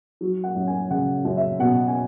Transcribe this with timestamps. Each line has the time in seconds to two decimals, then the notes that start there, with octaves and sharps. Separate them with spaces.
0.21 F#3
0.44 F#5
0.55 F#2
0.67 G#5
0.91 C#3 F#5
1.25 F#2
1.37 E5
1.59 B2 F#5
1.88 G#5